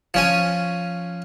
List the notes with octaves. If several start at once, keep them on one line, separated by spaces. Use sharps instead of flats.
F3 C#4 G#5